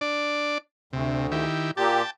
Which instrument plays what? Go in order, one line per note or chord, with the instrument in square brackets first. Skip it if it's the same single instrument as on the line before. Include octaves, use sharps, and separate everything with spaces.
[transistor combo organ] D4 D5
[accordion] D2 [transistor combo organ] C3
[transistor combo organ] D#3 E4 G4
[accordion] A#2 G4 [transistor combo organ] G5 A5